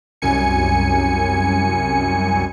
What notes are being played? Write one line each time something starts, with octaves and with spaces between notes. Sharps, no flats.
C2 F#2 G#5 C#7